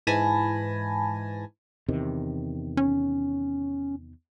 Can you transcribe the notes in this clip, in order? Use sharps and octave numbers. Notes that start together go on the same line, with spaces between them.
G#2 E3 G#5 A5 B5 A#6
E2 C3 D#3
C#4